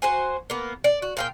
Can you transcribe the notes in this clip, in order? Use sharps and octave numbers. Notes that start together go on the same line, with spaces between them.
F#4 C5 G#5
A#3 B3
D5
F#4
A#2 F5 G5